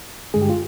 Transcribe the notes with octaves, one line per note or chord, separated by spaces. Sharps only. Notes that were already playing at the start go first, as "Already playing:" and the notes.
G2 D3 G#3 G#4
G4
F4